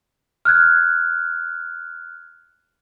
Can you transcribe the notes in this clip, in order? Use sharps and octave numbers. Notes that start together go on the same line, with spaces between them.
F6 F#6 G#6